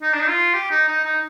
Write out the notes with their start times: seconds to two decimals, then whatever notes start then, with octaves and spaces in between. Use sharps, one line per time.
0.02 D#4
0.13 D4
0.20 D#4
0.28 F4
0.54 G4
0.70 D#4
0.88 D#4
1.05 D#4